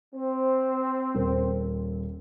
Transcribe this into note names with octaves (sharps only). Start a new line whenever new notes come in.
C4
D#1 A#4